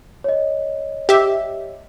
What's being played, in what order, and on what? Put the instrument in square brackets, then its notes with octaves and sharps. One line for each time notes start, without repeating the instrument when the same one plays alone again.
[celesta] C#5 D#5
[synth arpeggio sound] G4 E5